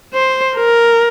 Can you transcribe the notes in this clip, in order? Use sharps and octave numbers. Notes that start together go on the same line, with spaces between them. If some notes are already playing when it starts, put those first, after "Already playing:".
C5
A#4